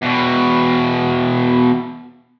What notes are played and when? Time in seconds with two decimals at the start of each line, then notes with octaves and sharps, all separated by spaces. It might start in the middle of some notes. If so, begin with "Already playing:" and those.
0.02 E2 B2